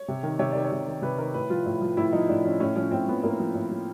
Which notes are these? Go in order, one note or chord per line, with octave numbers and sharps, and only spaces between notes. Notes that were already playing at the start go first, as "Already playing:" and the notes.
Already playing: C#5
C3
D#3
C3 C#5
D#3 D5
C#5
C3
D#3
C3 B4
D#3 A#4
A2 B4
F3 F4
A2
F3
A2 E4
F3 D#4
A2 D4
F3 C#4
A2 C#4
F3 C#4
A2 C4
F3 B3
A2 A#3
F3
A2
F3